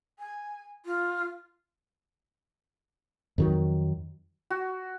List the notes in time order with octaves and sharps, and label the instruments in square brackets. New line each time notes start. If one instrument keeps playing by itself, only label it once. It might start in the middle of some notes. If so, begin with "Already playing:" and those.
[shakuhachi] G#5
F4
[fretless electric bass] F2 D#3 F#3
[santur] F#4